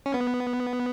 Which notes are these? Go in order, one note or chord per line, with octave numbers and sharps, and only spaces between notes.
C#4
B3